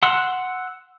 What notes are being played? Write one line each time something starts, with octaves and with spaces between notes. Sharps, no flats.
F#5 C6 E6 F#6